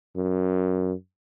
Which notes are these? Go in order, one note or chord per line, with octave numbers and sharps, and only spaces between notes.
F#2